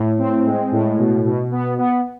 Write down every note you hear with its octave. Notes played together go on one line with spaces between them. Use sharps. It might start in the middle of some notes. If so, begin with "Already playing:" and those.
Already playing: A2
C4
G#3
A2
B2
B2
B3
B3